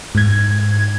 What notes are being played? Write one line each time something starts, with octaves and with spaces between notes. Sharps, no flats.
G#2 G#6